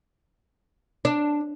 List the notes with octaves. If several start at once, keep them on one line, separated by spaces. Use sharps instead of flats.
D4